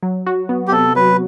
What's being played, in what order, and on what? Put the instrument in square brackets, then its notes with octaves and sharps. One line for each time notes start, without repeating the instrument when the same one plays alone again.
[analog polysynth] F#3
F#4
B3
[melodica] G4
[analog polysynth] C3 [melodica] A4
[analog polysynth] F#3 [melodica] B4